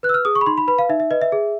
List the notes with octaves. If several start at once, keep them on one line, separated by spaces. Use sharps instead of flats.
B4 F#6
E6
F6
G#4 D#6
C#6
B5
D#4 C6
B5
B4 B5
F5
D#4 E5
E5
B4 D#5
E5
G#4